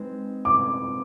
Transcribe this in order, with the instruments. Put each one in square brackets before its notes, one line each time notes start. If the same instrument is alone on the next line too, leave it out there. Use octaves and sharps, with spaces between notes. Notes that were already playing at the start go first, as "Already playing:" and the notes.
Already playing: [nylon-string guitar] G#3 C4 D#4 B4
[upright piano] D6